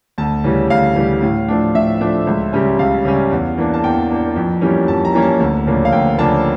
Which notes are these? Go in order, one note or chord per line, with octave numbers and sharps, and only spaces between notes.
D2 A5
C#3 E3 G3
D2 F5
C#3 E3 G3
A2
F3 A3 D4
A2 E5
F3 A3 D4
C#2
C#3 G3 C#4
C#2 F5
C#3 G3 C#4
E2
E3 A#3 D4
A5
E2 G5
E3 A#3 D4
F2
E3 G3 A#3 C#4
F2 A5
A#5
E3 G3 A#3 C#4
A5
D2
C#3 F3 A#3 D4
F5
D2 G5
C#3 F3 A#3 D4 A5